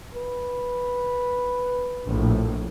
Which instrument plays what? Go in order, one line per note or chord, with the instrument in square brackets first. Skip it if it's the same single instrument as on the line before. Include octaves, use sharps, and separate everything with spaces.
[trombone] B4
[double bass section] A#1 A2